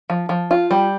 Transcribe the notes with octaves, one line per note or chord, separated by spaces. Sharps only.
F3
F3
F4
G3